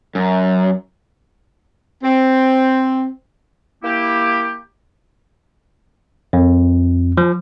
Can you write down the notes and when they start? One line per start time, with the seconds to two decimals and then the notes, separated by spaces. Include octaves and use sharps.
0.15 F#2
2.03 C4
3.83 A#3 E4 G4
6.33 F2
7.17 F3